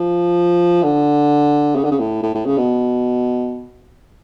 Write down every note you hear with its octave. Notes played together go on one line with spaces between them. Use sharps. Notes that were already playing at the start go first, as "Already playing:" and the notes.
Already playing: F3
D3
C#3
D3
C#3
A2
A2
A2
C#3
B2